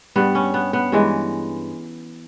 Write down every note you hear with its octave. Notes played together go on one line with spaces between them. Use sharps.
G2 G3 B3
C#4
B3
B3
G2 E3 G#3